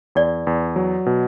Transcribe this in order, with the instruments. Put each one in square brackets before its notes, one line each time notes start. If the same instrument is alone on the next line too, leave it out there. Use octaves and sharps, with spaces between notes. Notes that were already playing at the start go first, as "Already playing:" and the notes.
[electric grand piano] E2 [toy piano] D5
[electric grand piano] E2
F#3
B2